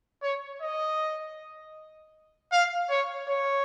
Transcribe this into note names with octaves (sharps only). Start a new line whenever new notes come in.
C#5
D#5
F5
C#5
C#5